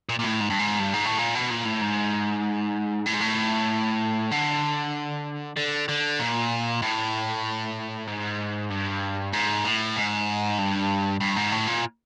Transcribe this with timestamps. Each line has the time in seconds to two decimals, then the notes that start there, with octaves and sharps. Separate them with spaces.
0.09 A#2
0.19 A#2
0.24 A2
0.40 G#2
0.50 G2
0.59 G#2
0.79 G2
0.93 G#2
1.05 A2
1.18 A#2
1.35 B2
1.50 A#2
1.65 A2
1.81 G#2
3.06 A2
3.14 G#2
3.21 A2
4.31 D3
5.56 D3
5.89 D3
6.19 A#2
6.82 A2
8.08 G#2
8.71 G2
9.33 G#2
9.65 A2
9.96 G#2
10.58 G2
11.20 G2
11.36 G#2
11.52 A2
11.67 A#2